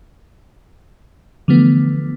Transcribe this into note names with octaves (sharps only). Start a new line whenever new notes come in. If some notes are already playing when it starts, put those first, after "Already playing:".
D3 E3 F3 A3 B3